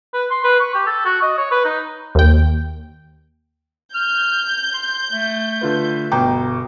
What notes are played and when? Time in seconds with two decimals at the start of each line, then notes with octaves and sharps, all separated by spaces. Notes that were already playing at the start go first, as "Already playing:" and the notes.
0.14 B4
0.31 C6
0.44 B4
0.60 C#6
0.74 G4
0.86 A4
1.05 F#4
1.22 D#5
1.38 C#5
1.51 B4
1.65 D#4
2.15 D#2 G5
3.94 F6 G6
4.74 C6
5.12 A3
5.61 D3 F4 B4
6.12 G1 B2 G5 A#5 D6 G6